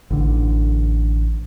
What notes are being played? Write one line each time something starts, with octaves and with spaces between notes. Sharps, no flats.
A1 D3